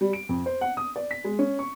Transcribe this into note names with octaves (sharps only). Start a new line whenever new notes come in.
G3
D7
F2
C5
F#5
D#6
D5
B6
G#3
C#4
C#6